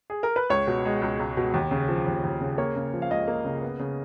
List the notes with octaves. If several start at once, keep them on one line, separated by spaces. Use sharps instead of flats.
G#4
A#4
B4
C#2 C#5
B2
G#3
C#2
C#2
B2
D#2
C#3
F3
D#2
D#2
C#3
A#3 C#5
C#3
F3
F5
C#2 D#5
A#3
C#3
B3
C#3